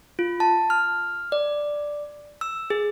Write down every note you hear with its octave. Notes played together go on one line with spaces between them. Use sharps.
F4
A5
F6
D5
E6
G#4